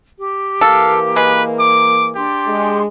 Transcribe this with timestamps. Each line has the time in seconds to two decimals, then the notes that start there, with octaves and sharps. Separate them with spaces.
0.17 G4
0.61 E3 A#3 A4 F5
1.16 G#3 B4
1.59 D6
2.15 D4 G4 C6
2.47 G#3